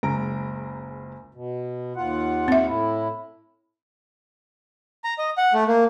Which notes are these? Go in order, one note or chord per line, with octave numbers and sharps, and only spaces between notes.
F#1 C#2 G#3 A#5 D7
B2
D#2 F4 F#5
C4 E5
A2 E4
A#5
D#5
F#5
A3
A#3